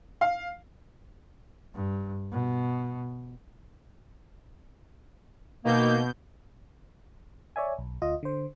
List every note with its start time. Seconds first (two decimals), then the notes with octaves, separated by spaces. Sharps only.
0.21 F5
1.75 G2
2.32 B2
5.65 B2 D#3 A#3 G6
7.56 C#5 D5 E5 G#5
7.78 B1
8.02 D2 F4 D#5
8.23 D3 C5